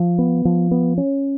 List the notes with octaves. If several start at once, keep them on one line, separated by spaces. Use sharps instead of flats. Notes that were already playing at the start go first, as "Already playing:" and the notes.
Already playing: F3
B3
F3
B3
C#4